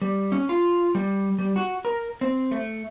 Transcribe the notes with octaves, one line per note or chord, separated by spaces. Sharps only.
G3
C#4
F4
G3
G3
F#4
A#4
C4
A3